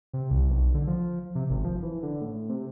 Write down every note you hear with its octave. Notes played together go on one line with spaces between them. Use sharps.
C3
C2
B1
D3
F3
C3
G#1
F3
E3
D3
A2
C3